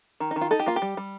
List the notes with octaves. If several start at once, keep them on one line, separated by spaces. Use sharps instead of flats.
D#3
D#4
D#3
F4
D#4 A4
G4
A#3 F4
G4
G3
G3